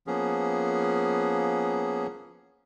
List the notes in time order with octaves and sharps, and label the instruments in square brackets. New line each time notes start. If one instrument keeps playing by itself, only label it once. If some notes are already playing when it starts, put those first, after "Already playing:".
[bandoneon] F3 A#3 B3 C#4 G#4